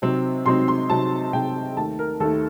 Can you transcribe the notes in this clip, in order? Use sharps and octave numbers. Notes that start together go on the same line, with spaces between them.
C3 F#3 C4 D#4
C3 F#3 C4 D#4 C6
C6
C3 F#3 C4 D#4 A5
C3 F#3 C4 D#4 G5
D#2 D#3 A3 A5
A#4
D#2 D#3 A3 A4